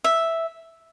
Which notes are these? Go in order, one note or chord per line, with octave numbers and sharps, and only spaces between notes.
E5